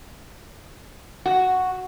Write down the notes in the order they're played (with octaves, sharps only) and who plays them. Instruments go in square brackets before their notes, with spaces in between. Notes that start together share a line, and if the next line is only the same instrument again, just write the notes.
[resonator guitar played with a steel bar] F#4